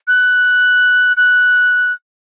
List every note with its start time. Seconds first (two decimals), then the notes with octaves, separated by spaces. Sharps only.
0.07 F#6
1.17 F#6